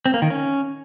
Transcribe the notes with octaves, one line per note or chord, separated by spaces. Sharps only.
C4
A#3
D#3
C#4